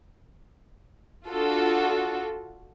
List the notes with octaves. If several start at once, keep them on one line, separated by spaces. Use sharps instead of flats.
D4 F4 F#4 A4